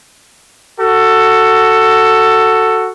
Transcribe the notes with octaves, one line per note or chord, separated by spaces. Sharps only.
F#4 A4